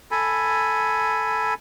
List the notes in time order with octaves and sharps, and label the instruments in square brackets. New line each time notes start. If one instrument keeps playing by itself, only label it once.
[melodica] A4 G#5 B5